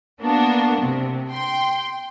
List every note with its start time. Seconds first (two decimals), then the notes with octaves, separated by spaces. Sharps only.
0.21 A#3 B3 D4 F#4
0.83 C3
1.31 G5 C6